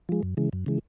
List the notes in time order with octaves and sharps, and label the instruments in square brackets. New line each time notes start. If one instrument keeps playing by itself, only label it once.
[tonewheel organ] F3 G#3
F#2
C#3 E3 G#3
F#2
C#3 E3 G#3